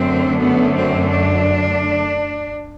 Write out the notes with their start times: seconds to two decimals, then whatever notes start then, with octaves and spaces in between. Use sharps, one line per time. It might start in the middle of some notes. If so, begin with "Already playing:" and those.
Already playing: F#2 D3 A3 C4
0.37 B3
0.73 C4
1.09 D4